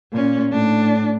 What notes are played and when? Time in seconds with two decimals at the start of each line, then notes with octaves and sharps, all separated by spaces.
0.12 A#2 C#4
0.52 A2 D4